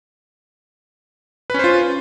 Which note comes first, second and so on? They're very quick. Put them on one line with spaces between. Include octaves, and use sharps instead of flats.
B4 C#4 C5 F4